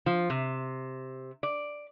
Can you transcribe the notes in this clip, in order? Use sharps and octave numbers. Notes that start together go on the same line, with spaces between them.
F3
C3
D5